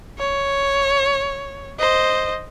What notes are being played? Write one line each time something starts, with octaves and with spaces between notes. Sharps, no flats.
C#5
C5 D#5